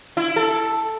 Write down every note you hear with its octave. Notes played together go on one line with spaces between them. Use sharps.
E4
A4